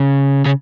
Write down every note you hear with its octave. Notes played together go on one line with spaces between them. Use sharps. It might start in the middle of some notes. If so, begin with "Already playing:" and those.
Already playing: C#3
C#3